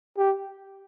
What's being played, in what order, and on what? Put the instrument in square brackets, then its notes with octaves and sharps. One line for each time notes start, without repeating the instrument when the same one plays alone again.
[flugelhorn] G4